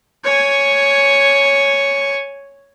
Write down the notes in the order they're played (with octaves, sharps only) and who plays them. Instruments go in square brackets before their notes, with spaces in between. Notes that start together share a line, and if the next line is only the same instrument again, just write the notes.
[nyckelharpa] C#5 G#5